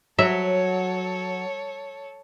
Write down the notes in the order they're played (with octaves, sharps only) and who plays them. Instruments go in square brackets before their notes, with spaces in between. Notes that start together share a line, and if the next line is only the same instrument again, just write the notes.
[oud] F#3 [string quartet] A4 C#5 [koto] E5